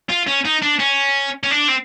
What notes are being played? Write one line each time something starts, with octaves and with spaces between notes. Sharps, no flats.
F4
C#4
D#4
D4
C#4
C#4
D4
C4